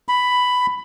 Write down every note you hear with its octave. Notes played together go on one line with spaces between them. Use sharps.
B5